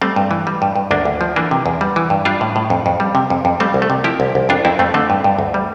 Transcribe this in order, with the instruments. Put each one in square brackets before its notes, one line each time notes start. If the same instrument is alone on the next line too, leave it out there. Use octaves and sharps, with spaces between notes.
[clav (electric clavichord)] G3 A3 C4
G2
E3
G3
G2
G2
D2 A#3 D4
D2
F3
E3 A#3 D4
C3
E2
G3
E3
G2
G3 D4 F4
A2
A2
F2
F2
G3
C3
F2
F2
G3 A3 C4
C2
A3
C3
F3 E4 G4
C2
C2
F2 D4 F4
F2 C4 E4
F2 A3 C4
D3 A3 C4
G2
G2
D2
G3